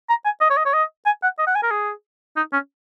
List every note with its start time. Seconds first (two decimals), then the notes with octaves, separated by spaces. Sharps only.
0.09 A#5
0.25 G#5
0.41 D#5
0.50 C#5
0.57 D#5
0.65 C#5
0.73 D#5
1.06 G#5
1.23 F#5
1.39 D#5
1.47 F#5
1.55 G#5
1.63 A#4
1.71 G#4
2.36 D#4
2.53 C#4